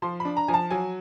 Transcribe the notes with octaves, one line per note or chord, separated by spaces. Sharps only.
F3 C6
B5
D4
A#5
F3 G#5
A5
F#3 G#5